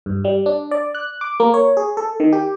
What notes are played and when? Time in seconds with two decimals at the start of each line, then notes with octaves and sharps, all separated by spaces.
0.06 G2
0.25 G3
0.46 D4
0.71 D5
0.95 F#6
1.21 D6
1.40 A#3
1.54 C#5
1.77 G#4
1.97 A4
2.20 D#3
2.32 G4